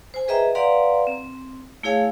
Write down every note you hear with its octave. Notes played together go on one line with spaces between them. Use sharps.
C5 G#5
G#4 B4 D#5 E5 G5 A#5
B4 D5 F5 F#5 A#5 C6
C4
A3 E4 G#4 C#5 F5 G#5